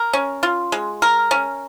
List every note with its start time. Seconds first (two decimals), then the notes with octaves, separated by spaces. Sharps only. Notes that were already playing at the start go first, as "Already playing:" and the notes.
Already playing: A#4
0.13 C#4
0.43 F4
0.72 G#3
1.02 A#4
1.31 C#4